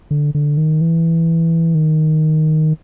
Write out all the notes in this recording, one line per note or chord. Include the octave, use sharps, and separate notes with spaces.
D3
D3
D#3
E3
D#3